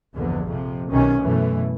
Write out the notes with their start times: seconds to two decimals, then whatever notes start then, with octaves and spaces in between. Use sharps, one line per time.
0.15 A#1 E2 G2 D3
0.47 F2 C3 F3
0.91 B1 C3 D#3 C#4
1.20 F#2 B2 E3 A3